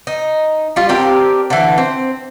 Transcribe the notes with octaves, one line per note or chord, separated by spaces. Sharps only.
D#4
G3 F4
C4 D4 G4 A#4
D3 E3
C4